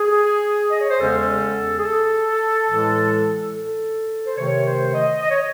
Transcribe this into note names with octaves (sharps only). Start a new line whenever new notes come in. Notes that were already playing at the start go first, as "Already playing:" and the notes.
Already playing: G#4
D#5
C#5
C5
E2 C#3 G#3 C#4 A4
G#4
A4
A2 E3 G#3
A4
C5
C3 D#3 A3 C#5
C5
D#5
D#5
C#5